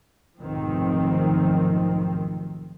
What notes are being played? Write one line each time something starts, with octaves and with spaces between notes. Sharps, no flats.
F1 B1 G#2 D#3 F3 C4